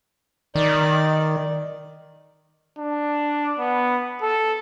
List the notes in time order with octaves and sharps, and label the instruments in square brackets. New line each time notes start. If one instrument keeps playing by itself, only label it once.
[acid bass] D#3 [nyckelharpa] D5
[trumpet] D4
B3
A4